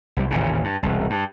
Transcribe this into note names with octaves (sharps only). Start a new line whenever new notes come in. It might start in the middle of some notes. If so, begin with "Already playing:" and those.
C2 G3
A1 D#2 A#2 C#3
G2
E1 C2
G2